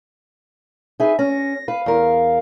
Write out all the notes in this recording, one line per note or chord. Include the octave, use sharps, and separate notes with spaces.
D#4 G#4 B4 E5
C#4 A#6
B4 F5
E2 A#4